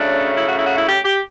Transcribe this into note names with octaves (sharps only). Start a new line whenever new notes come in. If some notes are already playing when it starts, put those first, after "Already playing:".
Already playing: C#3 F#3 A3 C#4 D4
E4
F#4
E4
F#4
E4
G4
G4